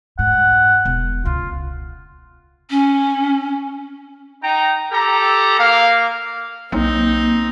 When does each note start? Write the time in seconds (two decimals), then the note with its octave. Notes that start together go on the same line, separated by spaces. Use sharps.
0.19 G#2 F#5
0.85 E1
1.26 C#2 F4
2.70 C#4
4.44 D#4 G5 A#5
4.92 G4 A4 A#5
5.59 A#3 F5
6.72 B1 A#3 C4 D#4